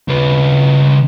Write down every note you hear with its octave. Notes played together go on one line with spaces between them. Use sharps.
C#3 B4